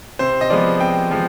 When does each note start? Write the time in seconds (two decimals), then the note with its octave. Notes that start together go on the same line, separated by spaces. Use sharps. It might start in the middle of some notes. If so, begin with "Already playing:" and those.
0.19 C3 C5
0.41 D#5
0.50 F3 G#3 B3 D5
0.80 C3 G5
1.11 F3 G#3